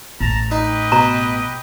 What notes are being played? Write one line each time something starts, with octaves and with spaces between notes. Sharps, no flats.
A1 A3 A5 A#5
D#4 G4 B4 D#5
B2 A#5